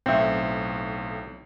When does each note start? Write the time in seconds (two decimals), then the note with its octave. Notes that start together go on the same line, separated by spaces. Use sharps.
0.06 B1 A2 C4 E5